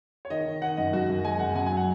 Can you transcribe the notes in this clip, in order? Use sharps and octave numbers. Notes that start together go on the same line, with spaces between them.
C#5
D#3 D#5
D#3
D#3 F#5
F#2 D#5
F#2 F#4
F#2
G#3 G#5
F#2 F#5
F#2 G#5
G#5
F#3
F#5